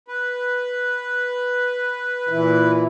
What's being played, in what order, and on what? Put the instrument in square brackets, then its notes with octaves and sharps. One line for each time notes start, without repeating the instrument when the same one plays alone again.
[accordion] B4
[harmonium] A#2 E3 E4